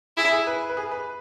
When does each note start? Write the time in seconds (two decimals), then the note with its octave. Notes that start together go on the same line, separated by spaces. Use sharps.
0.17 E4 G#4
0.32 G#4
0.47 B4
0.70 B4
0.77 G#4
0.91 B4